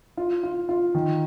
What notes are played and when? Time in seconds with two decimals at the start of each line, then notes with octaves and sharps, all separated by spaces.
0.17 F4
0.43 F4
0.69 F4
0.95 D#3